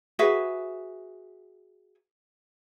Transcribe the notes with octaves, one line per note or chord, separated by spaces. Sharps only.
F#4 G#4 B4 E5